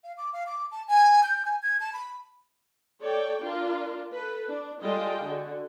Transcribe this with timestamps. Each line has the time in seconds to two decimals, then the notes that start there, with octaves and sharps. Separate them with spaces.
0.04 F5
0.17 D6
0.33 F5
0.46 D6
0.72 A5
0.88 G#5
1.23 G6
1.45 G#5
1.62 G#6
1.80 A5
1.93 B5
3.01 A4 C#5 D5 G5
3.42 D4 F4 A#4
4.13 A4 B4
4.49 D4
4.82 G3 G#3 F4 A4 D#5 G5
5.25 D3 F#4